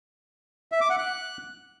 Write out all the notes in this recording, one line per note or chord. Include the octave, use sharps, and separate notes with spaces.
E5
D6
F#5
F#6